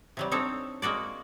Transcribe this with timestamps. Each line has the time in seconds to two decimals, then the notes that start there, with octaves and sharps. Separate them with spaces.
0.17 C3 F#3 G3
0.32 C4 D4 D#4 A4 C#5
0.82 G#3 A#3 F#4 D5